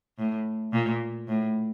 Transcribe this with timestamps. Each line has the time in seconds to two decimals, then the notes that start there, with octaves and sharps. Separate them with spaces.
0.18 A2
0.73 A#2
1.28 A2